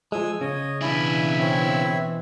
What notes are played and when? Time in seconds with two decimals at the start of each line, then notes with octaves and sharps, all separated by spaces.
0.12 F3 G#3 G#5 D#6 E6
0.41 C#3 C#5 D#5
0.82 B2 E3 D4 E4 E5 G#5 B5
1.40 C4 C#5 E5